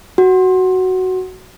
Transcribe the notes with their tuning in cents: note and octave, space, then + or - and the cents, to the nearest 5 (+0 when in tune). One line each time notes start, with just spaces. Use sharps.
F#4 +5